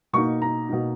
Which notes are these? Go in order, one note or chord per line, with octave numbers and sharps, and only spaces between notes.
B2 A#3 D#4 C#6
A#5
B2 A#3 D#4